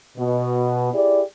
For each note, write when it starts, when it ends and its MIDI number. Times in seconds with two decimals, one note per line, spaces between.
0.17 0.93 47
0.93 1.22 64
0.93 1.22 67
0.93 1.22 68
0.93 1.22 74